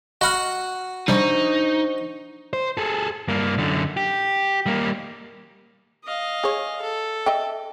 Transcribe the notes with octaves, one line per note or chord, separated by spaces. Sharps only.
F#4 D#5 F#5 B5 F6
C3 F3 G3 D4 D#4 C5 C#6
C5
G#4 A4
G2 A#3
F#2 D3
G4
G3 A#3
D#5 F5
G#4 C#5
A4
D#5 E5 G5